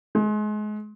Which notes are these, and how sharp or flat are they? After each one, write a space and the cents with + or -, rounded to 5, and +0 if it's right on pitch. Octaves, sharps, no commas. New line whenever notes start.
G#3 +30